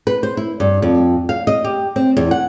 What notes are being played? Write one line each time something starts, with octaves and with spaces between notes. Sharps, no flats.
B4
C5
E4
G2
F2
F5
D#5
G4
C4
E2
F#5